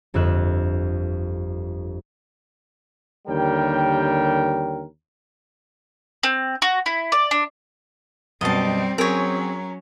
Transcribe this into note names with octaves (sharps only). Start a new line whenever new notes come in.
G1 F2 E6 F#6
D#2 D3 G3 A#4 C#5 G5
C4
F#4
E4
D5
D4
F#2 B2 G3 C4 D#5 A5
F#3 C4 C#4 G#4 A#4 C#5